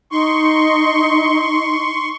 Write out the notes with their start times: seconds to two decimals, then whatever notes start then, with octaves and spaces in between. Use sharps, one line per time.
0.11 D#4 C6 C#6